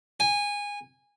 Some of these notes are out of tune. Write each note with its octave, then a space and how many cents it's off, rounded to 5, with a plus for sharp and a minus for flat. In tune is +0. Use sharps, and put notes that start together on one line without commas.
G#5 -20